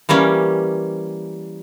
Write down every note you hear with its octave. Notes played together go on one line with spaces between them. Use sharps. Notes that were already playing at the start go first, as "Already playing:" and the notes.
E3 G3 A#3 C#4